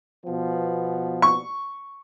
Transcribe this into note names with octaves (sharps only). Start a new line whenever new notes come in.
B2 F3 B3
C#6